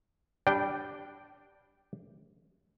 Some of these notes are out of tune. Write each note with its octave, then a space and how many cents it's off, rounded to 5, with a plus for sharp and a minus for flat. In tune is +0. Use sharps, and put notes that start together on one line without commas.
G3 +5 D4 +0 G5 -10